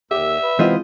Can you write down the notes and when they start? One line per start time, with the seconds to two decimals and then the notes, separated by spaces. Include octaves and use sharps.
0.11 D#2 G4 E5 E6
0.43 B4
0.59 C3 E3 G#3 B3 C4 E4 F4 D#5